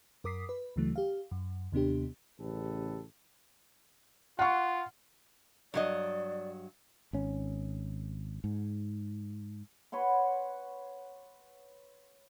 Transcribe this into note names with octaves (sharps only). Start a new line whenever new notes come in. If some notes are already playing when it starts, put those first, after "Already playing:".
F#2 A#4 D6 D#6 B6 C7
B4
D2 C#3 E3 F#3 A3
G4 F5
F#2
D#2 C3 B3 D4 G4
A1 C#3 G4 A4 B4
F4 F#5 C#6
G2 F#3 D5 D#5
G#1 C#4
G#2
B4 C#5 F#5 C6